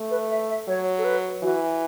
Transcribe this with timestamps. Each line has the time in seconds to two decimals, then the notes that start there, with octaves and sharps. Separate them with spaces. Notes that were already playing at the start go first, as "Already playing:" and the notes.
Already playing: A3
0.11 B4
0.30 E5
0.49 E5
0.68 F#3 C#5
0.98 A4
1.04 B4
1.43 E3 F#4